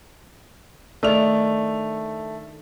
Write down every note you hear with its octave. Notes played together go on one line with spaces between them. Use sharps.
D#3 A3 D4 F7